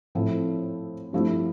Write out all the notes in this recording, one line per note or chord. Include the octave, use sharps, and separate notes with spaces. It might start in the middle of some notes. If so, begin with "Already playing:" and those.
A2 F3 C4 E4 A4
G2 F3 A3 E4